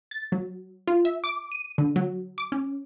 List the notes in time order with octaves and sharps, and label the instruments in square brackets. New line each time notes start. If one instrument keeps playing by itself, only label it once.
[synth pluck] A6
F#3
F4
E5
D6
D#7
D3
F#3
D6
C#4